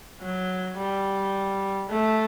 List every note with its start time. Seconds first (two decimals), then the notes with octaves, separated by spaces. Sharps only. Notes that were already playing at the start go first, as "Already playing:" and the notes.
0.21 F#3
0.77 G3
1.88 A3